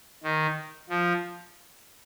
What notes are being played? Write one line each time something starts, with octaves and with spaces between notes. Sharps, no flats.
D#3
F3